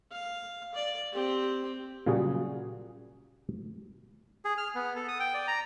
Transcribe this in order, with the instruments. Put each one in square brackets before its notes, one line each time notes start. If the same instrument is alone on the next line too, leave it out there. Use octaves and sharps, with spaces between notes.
[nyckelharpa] F5
D5
C4 G4
[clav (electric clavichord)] A#2 C#3 F#3 G3 F#4 G#4
[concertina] G#4
F6
B3
A4
D#6
G5
D5
A#5